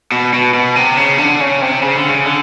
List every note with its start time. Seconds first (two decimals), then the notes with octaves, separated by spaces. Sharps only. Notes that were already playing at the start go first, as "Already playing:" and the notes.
0.12 B2
0.33 B2
0.54 B2
0.76 C3
0.97 C#3
1.18 D3
1.40 C#3
1.62 C3
1.83 C#3
1.96 D3
2.09 C#3
2.26 D3